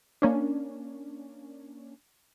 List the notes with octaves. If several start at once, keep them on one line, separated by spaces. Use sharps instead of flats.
A#3 C#4 D4